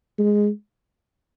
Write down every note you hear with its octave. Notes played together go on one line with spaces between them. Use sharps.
G#3